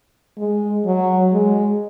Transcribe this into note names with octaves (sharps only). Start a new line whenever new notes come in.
G#3
F#3
G#3